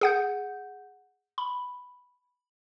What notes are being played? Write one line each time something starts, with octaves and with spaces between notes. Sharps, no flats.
G#4 F#5 G6
B5